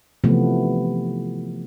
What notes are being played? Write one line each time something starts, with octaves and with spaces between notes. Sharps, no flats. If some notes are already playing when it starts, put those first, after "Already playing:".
C3 E3 F3 A3 B3